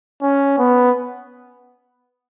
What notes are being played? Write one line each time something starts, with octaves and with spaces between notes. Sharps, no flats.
C#4
B3